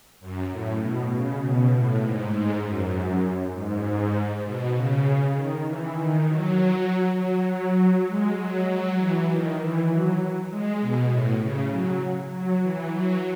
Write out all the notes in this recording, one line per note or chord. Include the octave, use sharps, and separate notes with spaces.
F#2
A2
B2
C#3
B2
A2
G#2
G#2
F#2
G#2
B2
C#3
D#3
E3
D#3
F#3
F#3
F#3
G#3
F#3
F#3
E3
D#3
E3
F#3
G#3
B2
A2
C#3
F#3
F#3
E3
F#3